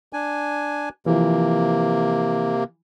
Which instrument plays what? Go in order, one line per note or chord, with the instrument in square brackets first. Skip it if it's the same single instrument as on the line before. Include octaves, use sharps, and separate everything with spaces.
[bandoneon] D4 G#5
[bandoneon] C3 A#3 [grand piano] E3 F3